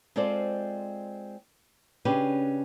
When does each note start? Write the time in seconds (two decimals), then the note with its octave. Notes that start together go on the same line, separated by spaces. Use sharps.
0.16 G#3 C4 F4 A4 C5 D5
2.05 C#3 C#4 D4 G4 G#4 B4